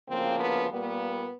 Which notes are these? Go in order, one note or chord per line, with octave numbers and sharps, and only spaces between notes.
D2 C#3 F3 A#3 C4
B3
A#2 G3 A#3 B3